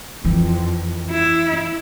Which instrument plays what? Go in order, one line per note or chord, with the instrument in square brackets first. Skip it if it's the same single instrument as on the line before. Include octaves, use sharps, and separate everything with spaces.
[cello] F2 [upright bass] E3
[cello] E4